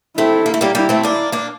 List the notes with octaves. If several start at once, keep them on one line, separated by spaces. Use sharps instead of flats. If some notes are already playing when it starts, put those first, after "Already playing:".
A3 C4 E4
A#3
A3
G3 A#3
G3 A#3 E4
A3 C4
A#3 D4
A#3 D4